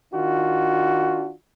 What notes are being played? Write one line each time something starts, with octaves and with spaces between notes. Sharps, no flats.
D#3 D4 F4 F#4